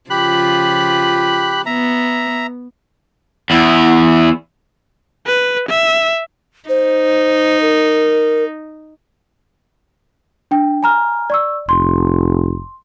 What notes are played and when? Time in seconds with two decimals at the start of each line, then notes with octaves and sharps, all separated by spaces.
0.10 C#3 F3 F4 G4 B5 F#6
1.66 B3 E5 A#5
3.50 E2 E4
5.26 B4
5.69 E5
6.69 D#4 C5
7.62 A#4
10.51 D4 G5
10.83 G#5 A#5 F6
11.30 D5 C#6 E6
11.69 F1 C6